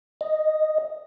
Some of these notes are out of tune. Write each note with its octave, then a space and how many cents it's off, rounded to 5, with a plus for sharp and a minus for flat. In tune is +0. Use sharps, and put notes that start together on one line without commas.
D#5 -5